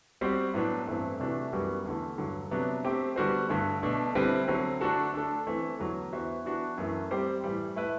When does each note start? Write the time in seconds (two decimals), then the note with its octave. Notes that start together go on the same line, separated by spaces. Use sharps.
0.21 G3 C4 F#4 C5
0.54 A2 F#3 B3 D4
0.87 G2 E3 A3 C4
1.20 C3 E3 A3 D4 F#4
1.53 F#2 E3 G3 B3 F#4
1.86 E2 D3 A3
2.18 G2 D3 F#3
2.51 C3 F#3 B3 D4
2.84 A3 C4 G4
3.16 D3 G3 B3 F#4 C5
3.49 G2 D3 A3
3.83 B2 A3 D4
4.15 D3 G3 C4 E4 B4
4.48 D3 F#3 C4
4.81 D3 A3 D4 F#4 A4
5.14 A3 D4 A4
5.47 E3 A3 C4
5.79 E2 D3 F#3
6.13 E3 B3 F#4 C5 E5
6.45 E3 B3 D4 F#4
6.78 F#2 E3 A3 E4 B4
7.11 G3 C4 G4 C5
7.44 A2 E3 G3
7.76 A3 E4 B4